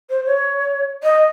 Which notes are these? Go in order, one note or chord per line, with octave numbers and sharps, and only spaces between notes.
C5
C#5
D#5